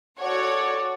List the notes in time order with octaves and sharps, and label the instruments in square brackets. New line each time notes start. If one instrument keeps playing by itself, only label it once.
[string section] F#4 A4 C#5 [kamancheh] D5 F#5